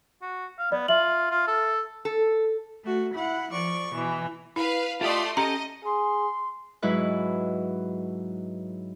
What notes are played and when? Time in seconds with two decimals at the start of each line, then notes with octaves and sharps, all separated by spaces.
0.22 F#4
0.59 F5
0.72 B3 D5
0.88 F4 E5 F#7
1.31 F4
1.48 A4
2.05 A4
2.84 A3 F#4
3.15 E4 F#5
3.51 F3 D5 C#6
3.94 B2 E3
4.56 E4 B4 F5
5.01 A3 F4 G4 D5 D#5 C6
5.37 C#4 G4 A4 D#5 A#5
5.85 G#4 C6
6.82 G#2 F#3 E4 B4 F#6